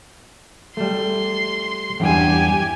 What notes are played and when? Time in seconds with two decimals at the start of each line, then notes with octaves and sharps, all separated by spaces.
0.77 G3 A3 C6
2.00 E2 G2 G4 G#5